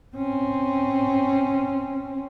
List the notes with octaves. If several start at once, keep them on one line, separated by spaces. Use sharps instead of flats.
C4 C#4